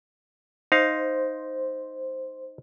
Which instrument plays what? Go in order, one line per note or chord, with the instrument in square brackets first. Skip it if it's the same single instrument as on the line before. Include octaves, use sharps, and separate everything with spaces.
[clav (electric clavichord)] D#4 F5 [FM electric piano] C5